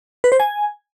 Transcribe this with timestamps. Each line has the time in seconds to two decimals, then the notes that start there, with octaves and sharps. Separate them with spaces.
0.24 B4
0.32 C5
0.40 G#5